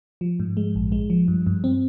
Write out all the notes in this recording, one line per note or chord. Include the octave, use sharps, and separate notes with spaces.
F3
G#2
G#3
A#1
G#3
F3
G2
G2
C4